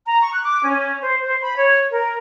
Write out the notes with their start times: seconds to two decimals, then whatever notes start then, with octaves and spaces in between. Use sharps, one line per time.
0.06 A#5
0.21 C#6
0.33 F#6
0.45 D6
0.64 C#4
1.01 C5
1.22 C5
1.41 B5
1.56 C#5
1.90 A#4